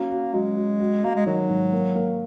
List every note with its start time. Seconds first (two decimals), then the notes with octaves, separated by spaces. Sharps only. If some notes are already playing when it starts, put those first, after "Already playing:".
Already playing: F#3 A#3 C#4 F#4
0.10 F#4
0.33 F#3 G#3
0.57 F#3
0.80 F#4
1.03 A#3 F#4
1.16 G#3
1.26 D#3 F#3
1.49 G#2
1.73 A#3
1.95 A#3